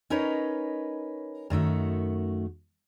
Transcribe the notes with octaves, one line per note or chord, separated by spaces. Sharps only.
C#4 D#4 A#4 B4 C#5 D#5
F#2 D#3 A3 F#4